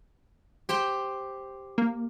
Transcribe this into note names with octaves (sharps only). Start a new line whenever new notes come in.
G4 C5 G5
A#3